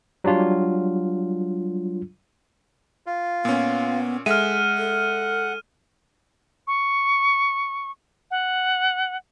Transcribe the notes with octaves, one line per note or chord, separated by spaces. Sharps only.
F#3 G3 D4 F4
F4
A#2 B3 C#4
G#3 A4 E5 F#5 F6 D#7
A4
C#6
F#5